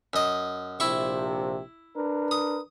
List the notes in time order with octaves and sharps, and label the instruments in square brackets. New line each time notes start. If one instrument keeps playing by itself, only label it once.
[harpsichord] F#2 D#5
[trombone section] A#1 C3 [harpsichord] E4 C#6
[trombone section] D4 A#4 B4
[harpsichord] D#6